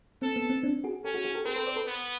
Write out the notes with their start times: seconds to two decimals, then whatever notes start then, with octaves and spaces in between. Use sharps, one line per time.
0.22 C4 A4
0.36 B3
0.50 C4
0.63 C4 D4
0.84 F#4 G#4
1.04 C#4 G4 A4
1.14 F#4 G#4
1.25 F#4 G#4
1.35 G4 A4
1.45 C4 G#4 A#4
1.56 A4 B4
1.66 C5 D5
1.76 A4 B4
1.87 B3